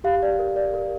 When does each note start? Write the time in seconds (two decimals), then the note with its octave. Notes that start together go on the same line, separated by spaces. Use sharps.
0.04 G4 F5
0.23 D5
0.39 A#4
0.56 D5
0.74 A#4